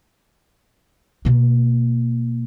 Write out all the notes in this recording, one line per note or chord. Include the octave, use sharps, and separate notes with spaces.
B2 A#3